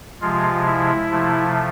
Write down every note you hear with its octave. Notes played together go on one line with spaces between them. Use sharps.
C3 F3 G#3 F4
E4
C3 F3 A3